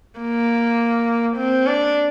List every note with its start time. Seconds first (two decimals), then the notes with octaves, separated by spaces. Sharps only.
0.20 A#3
1.37 C4
1.66 D4